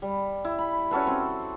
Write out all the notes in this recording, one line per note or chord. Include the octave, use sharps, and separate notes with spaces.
G3
E4
B5
C#4 F#4 A4 B4
C4